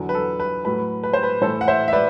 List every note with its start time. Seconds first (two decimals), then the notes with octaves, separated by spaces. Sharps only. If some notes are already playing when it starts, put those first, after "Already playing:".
Already playing: E2 D3 F#3
0.09 B4
0.14 A4
0.40 B4
0.65 A2 F#3 B4
1.03 B4
1.13 C5
1.23 B4
1.42 A2 E3 A4 C5
1.61 F#5
1.68 C5 E5
1.88 E5
1.93 B4 D5